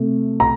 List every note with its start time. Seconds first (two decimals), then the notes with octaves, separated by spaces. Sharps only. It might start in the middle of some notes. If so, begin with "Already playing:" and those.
Already playing: C3 A3
0.40 A#5